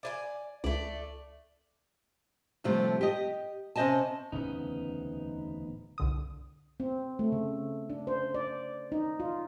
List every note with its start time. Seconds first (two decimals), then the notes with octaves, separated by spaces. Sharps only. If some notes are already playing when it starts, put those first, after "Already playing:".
0.03 D5 D#5 G#5
0.64 C#2 A3 D5
2.64 A2 C3 F3 G3 A3
3.01 G4 D#5
3.76 C3 C#4 C5 D#5 G#5 A5
4.32 D1 E2 C#3 B3 C#4 D#4
5.98 C2 D3 D#6
6.80 C4
7.19 A3
7.32 C#3
7.90 D4
8.07 C5
8.34 D5
8.92 D#4
9.20 F4